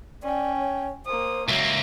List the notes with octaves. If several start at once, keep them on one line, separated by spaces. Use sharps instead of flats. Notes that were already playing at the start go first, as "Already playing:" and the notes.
C#4 D5 G5
C#5
A#3 C5 D#6
C#2 F#3 A#3 E5